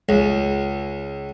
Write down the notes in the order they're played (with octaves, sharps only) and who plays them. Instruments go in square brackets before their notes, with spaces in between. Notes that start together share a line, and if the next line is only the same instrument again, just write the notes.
[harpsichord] C#2